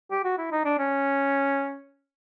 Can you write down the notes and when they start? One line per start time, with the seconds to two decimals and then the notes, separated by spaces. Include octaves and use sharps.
0.11 G4
0.24 F#4
0.38 E4
0.52 D#4
0.65 D4
0.78 C#4